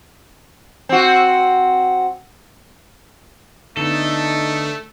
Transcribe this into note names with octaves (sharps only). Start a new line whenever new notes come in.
C4 F#4
D3 A3 B3 D#4 A4